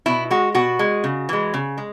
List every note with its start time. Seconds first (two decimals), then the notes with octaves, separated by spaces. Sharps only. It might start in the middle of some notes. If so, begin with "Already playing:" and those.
0.06 B2 E4
0.31 G#3 F#4
0.55 B2 F#4
0.79 G#3
1.04 C#3
1.29 E3 G#3
1.54 C#3
1.78 G#3